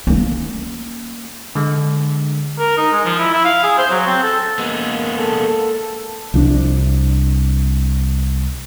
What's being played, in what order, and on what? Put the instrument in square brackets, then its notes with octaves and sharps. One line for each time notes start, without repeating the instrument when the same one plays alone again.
[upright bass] A#3 C#4
[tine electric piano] D3 G#3
[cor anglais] A#4
D#4
G#3
F3
E4
E4
F5
G#4
C5
F#3
C4
A4
[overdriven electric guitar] G#3 B3 [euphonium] A#3
[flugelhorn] A4
[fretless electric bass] C2 F3 C#4 D4